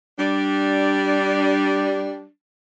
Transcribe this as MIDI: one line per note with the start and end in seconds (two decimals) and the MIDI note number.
0.18 2.27 55
0.18 2.27 62